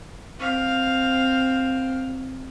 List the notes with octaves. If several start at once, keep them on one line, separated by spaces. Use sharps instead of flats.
C4 F5